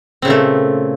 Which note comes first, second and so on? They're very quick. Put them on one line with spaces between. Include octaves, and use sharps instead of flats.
C4 C#3 A#2 A3